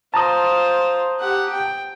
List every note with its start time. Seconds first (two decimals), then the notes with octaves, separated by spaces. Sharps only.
0.14 F4 C5 A5 A#5 D#6
1.20 G4 F#5
1.53 G5